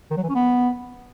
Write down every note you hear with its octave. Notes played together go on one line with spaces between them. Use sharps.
D#3
F#3
E3
C#4
B3